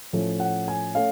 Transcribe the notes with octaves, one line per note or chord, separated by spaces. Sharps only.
A2 F3 A3 C#4
F#5
G#5
A3 C#4 F5